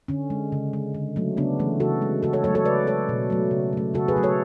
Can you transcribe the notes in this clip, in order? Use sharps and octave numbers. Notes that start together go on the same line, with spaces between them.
D3 C#4
G#3
C#3
G#3
D3
F#3 A3
C#3 B3 D4
E3 A3
C#3 F#4 A4
G#3
C#3 F#4 A4
A4 C#5
F#3 A3 A4 C#5
A4 C#5
C#3 B4 D5
G#3 A4 C#5
B2
F#3 A3
C#3
F#3 A3
C#3 F#4 A4
G#4 B4
F#3 A3
A4 C#5